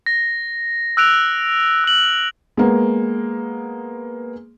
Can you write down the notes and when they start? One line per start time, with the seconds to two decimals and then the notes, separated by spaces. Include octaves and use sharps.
0.06 A#6
0.97 E6 F#6 D7 F7
1.84 E6 F#7
2.57 G#3 A#3 B3